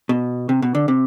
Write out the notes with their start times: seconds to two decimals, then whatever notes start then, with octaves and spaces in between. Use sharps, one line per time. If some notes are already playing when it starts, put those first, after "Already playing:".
0.09 B2
0.49 C3
0.62 B2
0.75 D3
0.88 C3